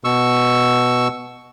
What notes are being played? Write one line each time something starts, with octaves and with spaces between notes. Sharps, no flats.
B2 C#6 E6